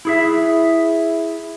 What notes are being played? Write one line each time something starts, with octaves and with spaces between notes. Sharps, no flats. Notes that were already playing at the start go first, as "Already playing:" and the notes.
E4 G#4 E5